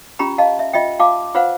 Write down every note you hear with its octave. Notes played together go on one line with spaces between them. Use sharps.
C#4 F4 G4 A#5 B5
D#5 F5 A5
E5
F4 D#5 E5 G5
F4 F5 A5 D6
F4 B4 C5 F5 F#5